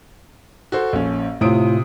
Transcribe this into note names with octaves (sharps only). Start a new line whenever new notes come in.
F#4 A4 C5
A#1 C#4
A2 C3 F4 D#6 D7